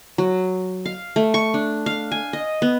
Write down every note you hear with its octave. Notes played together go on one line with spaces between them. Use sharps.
F#3
F5
A3
C#6
D4
F5
G#5
D#5
B3